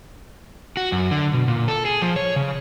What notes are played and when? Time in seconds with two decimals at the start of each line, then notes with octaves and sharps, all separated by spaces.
0.77 F#4
0.92 F#2
1.11 D3
1.33 B2
1.48 A#2
1.68 A4
1.85 G#4
2.02 F3
2.16 C#5
2.36 C#3